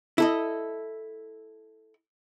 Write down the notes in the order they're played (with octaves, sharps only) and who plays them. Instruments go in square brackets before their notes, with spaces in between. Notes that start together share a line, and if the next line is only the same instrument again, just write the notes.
[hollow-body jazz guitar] E4 A4 D#5